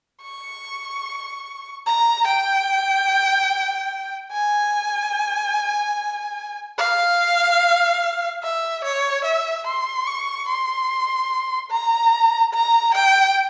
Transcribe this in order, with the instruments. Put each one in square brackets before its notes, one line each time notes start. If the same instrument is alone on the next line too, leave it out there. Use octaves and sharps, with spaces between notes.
[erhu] C#6
A#5
G5
G#5
F5
E5
C#5
E5
C6
C#6
C6
A#5
A#5
G5